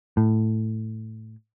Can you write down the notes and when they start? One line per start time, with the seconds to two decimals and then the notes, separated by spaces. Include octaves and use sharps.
0.17 A2